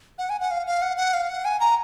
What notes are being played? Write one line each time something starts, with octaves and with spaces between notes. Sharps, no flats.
F#5
G#5
F#5
F5
F5
F#5
F#5
F5
F#5
G#5
A#5